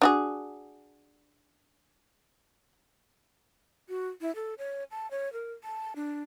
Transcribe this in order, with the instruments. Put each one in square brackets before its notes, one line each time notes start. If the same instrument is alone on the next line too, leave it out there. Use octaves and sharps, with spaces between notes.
[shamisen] D4 F#4 G#4
[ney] F#4
E4
A4
C#5
A5
C#5
A#4
A5
D4